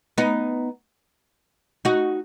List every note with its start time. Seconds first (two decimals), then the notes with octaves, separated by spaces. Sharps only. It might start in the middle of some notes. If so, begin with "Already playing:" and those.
0.18 B3 D#4
1.85 D#4 F#4